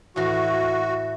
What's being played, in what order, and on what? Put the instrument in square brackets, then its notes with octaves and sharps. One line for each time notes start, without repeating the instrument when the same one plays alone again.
[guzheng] A2 E3 [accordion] F#4